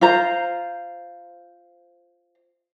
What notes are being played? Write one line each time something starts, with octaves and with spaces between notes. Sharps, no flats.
F4 C5 A#5